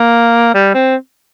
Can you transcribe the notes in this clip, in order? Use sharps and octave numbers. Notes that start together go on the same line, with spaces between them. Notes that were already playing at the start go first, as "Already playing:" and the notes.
Already playing: A#3
G3
C4